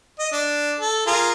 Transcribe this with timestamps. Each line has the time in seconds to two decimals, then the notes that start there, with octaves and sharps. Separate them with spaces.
0.19 D#5
0.32 D4
0.80 A4
1.07 F4 G#4 A#4